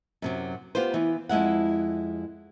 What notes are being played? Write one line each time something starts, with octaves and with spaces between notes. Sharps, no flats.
F#2 C3 F#3
B3 F4 G4 B4 C5
E3 B3
F2 G#3 E4 F#5